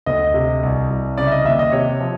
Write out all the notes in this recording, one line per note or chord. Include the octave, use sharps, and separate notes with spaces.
D2 D#5
C3
C2
C2
C#3 D5
E5
D#5
D#2 E5
D#5
C3 C#5
F3